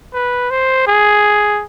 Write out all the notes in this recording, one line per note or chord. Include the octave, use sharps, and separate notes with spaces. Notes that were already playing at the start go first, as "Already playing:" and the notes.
B4
C5
G#4